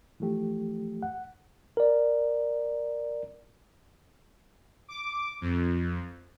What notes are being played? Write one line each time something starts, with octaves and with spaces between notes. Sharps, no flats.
E3 F3 A3 G4
F#5
A#4 D5
D6
F2